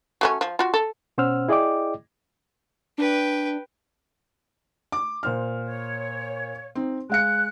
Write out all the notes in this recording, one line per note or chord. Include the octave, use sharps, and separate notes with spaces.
F#3 A3 C#4
F3
F4 F#4
A4
B2 C#4 C5 F#5 E6 F6
E4 G#4 D5 D#5 G5 D6
D4 B4 G5
D6
A#2 C5 F6
C#5
C4 D#4
G#3 F5 F#6 C#7